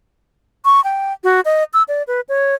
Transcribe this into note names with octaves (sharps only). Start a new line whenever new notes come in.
C#6
G5
F#4
D#5
E6
D5
B4
C#5